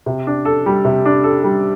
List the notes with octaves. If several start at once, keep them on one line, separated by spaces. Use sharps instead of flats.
C3
D4
A4
G3
C3
D4
A4
G3